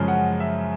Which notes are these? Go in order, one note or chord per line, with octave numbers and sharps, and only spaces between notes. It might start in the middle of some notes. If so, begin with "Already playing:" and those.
Already playing: F#2 C#3 F3 G#3 C#4
F#5
E5